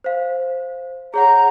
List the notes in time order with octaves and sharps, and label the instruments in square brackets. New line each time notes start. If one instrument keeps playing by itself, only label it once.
[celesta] C5 F5
[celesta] G#4 C#5 F#5 [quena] A#5